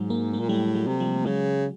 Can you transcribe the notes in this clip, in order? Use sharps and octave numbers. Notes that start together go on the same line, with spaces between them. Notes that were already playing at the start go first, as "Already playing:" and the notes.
Already playing: G#2 F#3 G#3
A#3
G#3 A#3
A#2
A2 G3 A3
F#3 G#3
C3
F3 G3
C#3 F#3 G#3